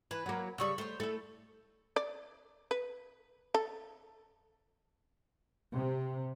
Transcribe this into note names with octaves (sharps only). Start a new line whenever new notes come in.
E3 B4
F#3 A#3
C#3 G3 B5 C#6 E6
A3 C5 C#5
A3 E4 A4
D5
B4
A4
C3